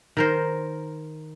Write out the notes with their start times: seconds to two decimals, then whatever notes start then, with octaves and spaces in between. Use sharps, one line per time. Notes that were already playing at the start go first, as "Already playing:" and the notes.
0.17 D#3 A#4 C5